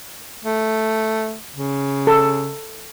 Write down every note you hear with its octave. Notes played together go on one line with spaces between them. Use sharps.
A3
C#3
A4